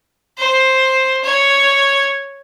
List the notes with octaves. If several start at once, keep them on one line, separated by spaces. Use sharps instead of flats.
C5
C#5